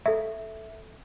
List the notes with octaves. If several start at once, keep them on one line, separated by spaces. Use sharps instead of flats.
A4 E5